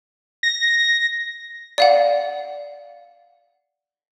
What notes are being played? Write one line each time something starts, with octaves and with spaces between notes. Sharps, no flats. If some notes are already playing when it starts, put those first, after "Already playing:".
A#6
D5 F5 F#5